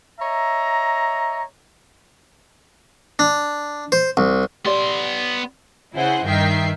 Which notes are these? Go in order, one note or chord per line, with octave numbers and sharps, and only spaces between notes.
C#5 D#5 E5 A#5
D4
C5
C2
B3 G4 D5 C6
C#3 E4 G#4 C5 F#5
G2 D#3 E5 G5 C7